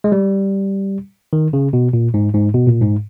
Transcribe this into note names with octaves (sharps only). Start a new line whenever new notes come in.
G#3
G3
D#3
C#3
B2
A#2
G#2
G#2
B2
A#2
G#2